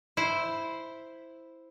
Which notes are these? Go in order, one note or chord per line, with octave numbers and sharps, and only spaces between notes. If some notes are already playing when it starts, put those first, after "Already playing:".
E4 C5